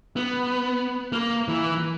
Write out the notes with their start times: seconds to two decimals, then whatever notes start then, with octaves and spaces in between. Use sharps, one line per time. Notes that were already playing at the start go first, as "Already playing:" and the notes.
0.16 B3
1.12 A#3
1.48 E3